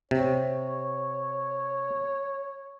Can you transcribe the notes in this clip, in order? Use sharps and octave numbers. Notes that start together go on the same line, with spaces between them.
C3 C#5